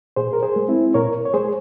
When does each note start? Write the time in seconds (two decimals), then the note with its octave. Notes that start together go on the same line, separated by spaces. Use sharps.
0.16 A#2 G#4 C5
0.33 A#4
0.43 G#4 C5
0.56 G#3
0.68 C4 E4
0.94 A#2 A#4 C#5
1.25 C#5
1.34 G#3 G#4 C5